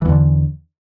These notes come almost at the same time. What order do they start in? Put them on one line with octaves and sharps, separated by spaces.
E3 E2 D3